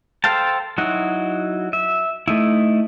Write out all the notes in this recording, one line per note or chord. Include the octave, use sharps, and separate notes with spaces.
A4 C5 F5 G5 A5
F#3 D#4 E4 F#4
E5
A3 D#4 E4